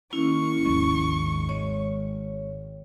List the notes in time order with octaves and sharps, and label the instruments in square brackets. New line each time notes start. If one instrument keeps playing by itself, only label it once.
[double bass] D#3 A#3 [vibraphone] C#4 E4 [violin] C#6
[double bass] G#1 [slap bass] D#2 F3 G#3
[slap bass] G#3 [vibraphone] C#5